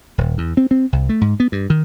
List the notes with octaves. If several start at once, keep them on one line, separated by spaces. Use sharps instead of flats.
D#1
E2
C4
C4
C2
A3
G#2
B3
G2
D#3